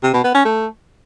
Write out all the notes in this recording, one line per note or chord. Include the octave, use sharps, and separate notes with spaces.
C3
B2
B3
C#4
A3